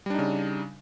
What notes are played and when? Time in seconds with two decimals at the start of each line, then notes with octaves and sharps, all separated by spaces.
0.06 G3
0.10 D4
0.14 D#4
0.19 C#3